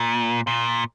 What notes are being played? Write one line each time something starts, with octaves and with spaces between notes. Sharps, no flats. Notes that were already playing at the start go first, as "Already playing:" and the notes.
Already playing: A#2
A#2